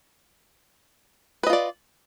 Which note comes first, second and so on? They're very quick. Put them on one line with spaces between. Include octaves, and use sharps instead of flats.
B4 D#5 F4 D5